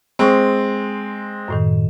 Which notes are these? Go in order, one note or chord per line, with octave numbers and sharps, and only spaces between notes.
G#3 C4 C5 C#6
F#2 A2 D#3